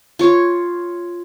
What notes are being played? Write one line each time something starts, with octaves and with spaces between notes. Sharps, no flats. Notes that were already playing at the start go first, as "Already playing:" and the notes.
F4 C#5